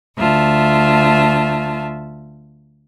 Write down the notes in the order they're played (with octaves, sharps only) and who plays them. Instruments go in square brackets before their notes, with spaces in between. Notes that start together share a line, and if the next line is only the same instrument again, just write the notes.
[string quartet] D2 F4 E5 A5